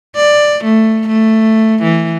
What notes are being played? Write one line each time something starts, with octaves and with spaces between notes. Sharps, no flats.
D5
A3
A3
E3